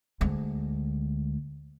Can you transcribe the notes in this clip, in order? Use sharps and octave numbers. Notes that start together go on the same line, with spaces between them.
D2 G#3